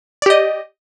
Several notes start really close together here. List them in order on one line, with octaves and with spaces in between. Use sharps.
D5 G4 D#5